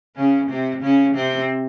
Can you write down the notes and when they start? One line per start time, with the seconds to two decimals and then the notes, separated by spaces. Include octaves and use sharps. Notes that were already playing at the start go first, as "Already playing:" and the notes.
0.16 C#3 C#4
0.49 C3 C4
0.82 C#3 C#4
1.15 C3 C4